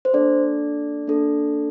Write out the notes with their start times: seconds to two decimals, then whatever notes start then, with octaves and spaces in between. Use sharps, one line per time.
0.05 C5
0.14 A#3 D4 A4 D5
1.07 A#3 D4 A4